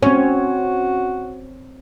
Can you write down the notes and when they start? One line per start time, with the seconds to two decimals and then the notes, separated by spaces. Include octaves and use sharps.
0.03 C4 C#4 F#4 C#5